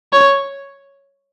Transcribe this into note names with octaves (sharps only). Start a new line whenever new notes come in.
C#5